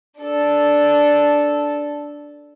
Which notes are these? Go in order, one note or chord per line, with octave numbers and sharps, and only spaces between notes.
D4 A4